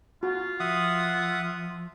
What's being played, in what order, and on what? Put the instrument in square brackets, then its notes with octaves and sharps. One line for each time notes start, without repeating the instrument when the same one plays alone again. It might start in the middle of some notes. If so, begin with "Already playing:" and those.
[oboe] F4 [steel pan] F#4
[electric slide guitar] F3 [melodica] E5 F#5 D#6